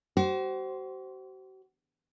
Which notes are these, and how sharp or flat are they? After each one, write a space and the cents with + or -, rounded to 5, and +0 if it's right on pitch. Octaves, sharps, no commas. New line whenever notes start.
F#4 +45 C5 +0